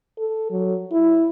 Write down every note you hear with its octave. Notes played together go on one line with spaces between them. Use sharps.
A4
F#3
E4